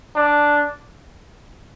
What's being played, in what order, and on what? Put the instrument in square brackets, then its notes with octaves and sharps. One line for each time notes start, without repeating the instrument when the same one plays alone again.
[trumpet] D4